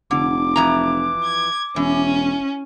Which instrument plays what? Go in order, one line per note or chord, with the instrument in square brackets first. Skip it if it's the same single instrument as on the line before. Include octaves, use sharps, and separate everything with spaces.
[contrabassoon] F1 [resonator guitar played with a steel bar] D3 [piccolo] D6
[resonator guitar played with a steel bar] F2 E3 A#5
[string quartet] G#6
[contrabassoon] E1 [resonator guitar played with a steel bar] E3 [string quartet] C#4